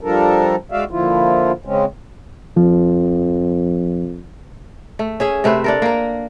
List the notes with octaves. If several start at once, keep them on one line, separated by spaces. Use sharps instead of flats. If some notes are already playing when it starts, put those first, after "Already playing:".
F3 G3 D4 A4 A#4
G#3 F#4 D5 E5 F5
A#2 D3 F3 E4 F4
C#3 G#3 C4 C#4
F2 F3
A3
C#4 G#4 E5
C3 A3 B4 C5
D4 A4 A#4
A#3 A#4